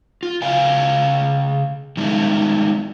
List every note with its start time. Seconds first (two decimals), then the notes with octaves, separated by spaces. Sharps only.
0.23 F4
0.42 C#3 B4 F5 G#5
1.97 D#3 G3 G#3 E4